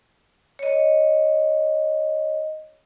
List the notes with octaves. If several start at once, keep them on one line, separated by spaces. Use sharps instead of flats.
C#5 D#5